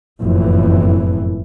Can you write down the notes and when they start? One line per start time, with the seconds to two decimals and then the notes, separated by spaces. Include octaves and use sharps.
0.19 F#1 F2 A2 E3